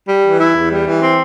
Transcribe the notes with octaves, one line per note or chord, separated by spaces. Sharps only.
G3
E3
E4
E2
G3
E3
C4